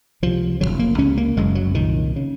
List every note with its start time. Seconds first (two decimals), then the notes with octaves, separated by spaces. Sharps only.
0.22 C#2 C3 F3
0.60 D#2 C#3 F#3
0.65 F1
0.79 A#3
0.98 C#2 C3 C#4
1.17 A#3
1.37 F#1 F#2 C#3 G#3
1.55 F#3
1.74 C2 A#2 D#3
2.16 C#3